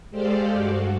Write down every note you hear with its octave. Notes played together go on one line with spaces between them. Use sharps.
G#3 G4 A4 C5 D5 F5
G2 F#4